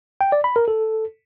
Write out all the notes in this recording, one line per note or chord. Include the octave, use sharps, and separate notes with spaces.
G5
D5
B5
A#4
A4